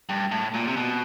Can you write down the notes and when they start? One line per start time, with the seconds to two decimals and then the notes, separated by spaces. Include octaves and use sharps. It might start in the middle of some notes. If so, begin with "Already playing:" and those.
0.09 G2
0.32 A2
0.54 A#2
0.67 C3
0.76 B2